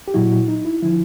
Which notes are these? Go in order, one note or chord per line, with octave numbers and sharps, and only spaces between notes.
G4
A#2 F#3 E4 F#4
D#4
E4
D3 F3 E4